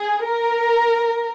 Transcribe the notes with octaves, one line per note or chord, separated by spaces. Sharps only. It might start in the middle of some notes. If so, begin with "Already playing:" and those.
Already playing: G#4
A#4